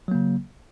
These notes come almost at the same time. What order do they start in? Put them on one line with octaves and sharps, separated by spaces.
F#3 A#3 C#3